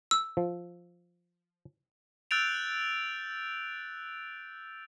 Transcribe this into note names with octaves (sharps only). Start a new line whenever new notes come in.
E6
F3
E6 F#6 G6 A6 D7 F7